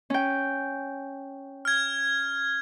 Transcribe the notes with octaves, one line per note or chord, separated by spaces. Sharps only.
C#4 G5
F6 G#6